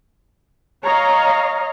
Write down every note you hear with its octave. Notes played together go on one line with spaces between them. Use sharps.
C#5 D#5 F5 A#5